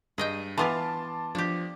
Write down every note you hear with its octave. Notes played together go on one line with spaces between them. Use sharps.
G2 G#4 D#5 G5
E3 B3 F4 A5 C6 D6
F3 D4 G4